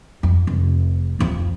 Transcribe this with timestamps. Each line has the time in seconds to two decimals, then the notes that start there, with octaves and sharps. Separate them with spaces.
0.23 F2
0.47 F1
1.19 D1 F2